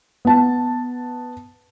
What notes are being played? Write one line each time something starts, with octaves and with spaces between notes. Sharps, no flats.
B3 A5